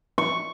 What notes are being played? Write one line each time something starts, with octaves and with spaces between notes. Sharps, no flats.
C#6